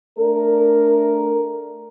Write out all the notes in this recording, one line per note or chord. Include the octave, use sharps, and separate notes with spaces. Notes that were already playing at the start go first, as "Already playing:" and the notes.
A3 D4 A#4